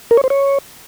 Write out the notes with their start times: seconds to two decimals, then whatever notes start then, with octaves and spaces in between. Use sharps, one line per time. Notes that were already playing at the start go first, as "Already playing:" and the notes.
0.11 A#4
0.17 C#5
0.24 C5
0.30 C#5